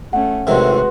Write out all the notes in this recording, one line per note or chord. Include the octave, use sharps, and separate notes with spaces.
A3 C#4 F#5
A2 C3 D#3 G#3 F#4 B4 C6